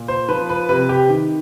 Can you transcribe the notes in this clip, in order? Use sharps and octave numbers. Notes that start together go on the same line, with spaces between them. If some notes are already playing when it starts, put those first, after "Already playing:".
Already playing: A#2
C5
F3 B4
B4
C3 B4
G4
D#3